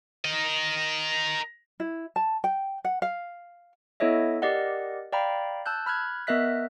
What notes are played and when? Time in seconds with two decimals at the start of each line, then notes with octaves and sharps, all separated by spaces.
0.25 A#4 D#5
1.80 E4
2.16 A5
2.44 G5
2.85 F#5
3.02 F5
4.00 B3 E4 A4 C#5 D#5 E5
4.42 G4 A#4 D5 D#5 F#5
5.12 D5 F5 G5 A#5 B5
5.66 A5 E6 F#6 G6
5.86 B5 F6 F#6 G#6
6.27 B3 A#4 D#5 E5 F#6 B6